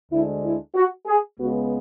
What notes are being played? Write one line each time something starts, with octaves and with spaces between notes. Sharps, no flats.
D2 D3 G#3 D4 E4
E4
F#4
G#4
C#2 C#3 G#3 B3 F#4